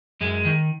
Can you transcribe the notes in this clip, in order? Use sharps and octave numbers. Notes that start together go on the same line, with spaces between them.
F#2 G#3
D#3